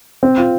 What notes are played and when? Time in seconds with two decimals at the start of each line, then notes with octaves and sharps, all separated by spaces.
0.23 C4
0.38 F4